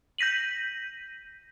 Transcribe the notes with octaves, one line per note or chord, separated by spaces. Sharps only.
G6 A#6 B6 D#7 F#7